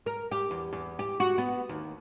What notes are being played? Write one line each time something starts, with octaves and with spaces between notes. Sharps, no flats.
A#4
G4
E2
E2
G4
F#4
B3
D#2